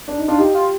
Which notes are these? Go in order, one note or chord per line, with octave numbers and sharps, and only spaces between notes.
D4
D#4
D4 F4
D#4 G4
F4